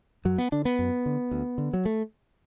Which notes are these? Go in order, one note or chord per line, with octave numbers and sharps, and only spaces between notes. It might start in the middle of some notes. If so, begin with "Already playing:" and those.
F#2 F#3
B3
D3 D4
B3
F#2
D3
D2
D3
F#3
A3